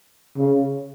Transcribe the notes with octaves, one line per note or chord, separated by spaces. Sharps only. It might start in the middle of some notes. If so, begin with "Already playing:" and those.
C#3